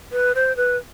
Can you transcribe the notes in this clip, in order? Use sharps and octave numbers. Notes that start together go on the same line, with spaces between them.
B4
C5
B4